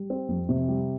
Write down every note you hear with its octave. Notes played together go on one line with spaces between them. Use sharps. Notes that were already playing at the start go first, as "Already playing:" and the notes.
Already playing: G3
C4
F2
C3
G3